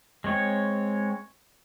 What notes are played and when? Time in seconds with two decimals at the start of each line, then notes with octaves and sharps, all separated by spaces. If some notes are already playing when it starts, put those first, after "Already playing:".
0.24 G#3 C4 C#5